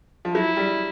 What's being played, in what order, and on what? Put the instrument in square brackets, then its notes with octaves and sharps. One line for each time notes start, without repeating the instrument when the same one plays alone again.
[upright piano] F3
[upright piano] F#3 [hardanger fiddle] E4
[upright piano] G3